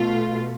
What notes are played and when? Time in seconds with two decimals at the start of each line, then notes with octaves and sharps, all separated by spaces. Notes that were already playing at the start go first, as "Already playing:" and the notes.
Already playing: B2 A3 F4